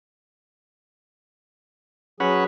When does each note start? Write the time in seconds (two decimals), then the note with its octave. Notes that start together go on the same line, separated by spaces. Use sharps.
2.20 F#3 C#4 F#4 G#4 B4